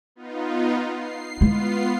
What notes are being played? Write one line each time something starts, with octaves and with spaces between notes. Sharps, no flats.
B3 D#4 F4
C7
G#3 B3 E4 F4 C7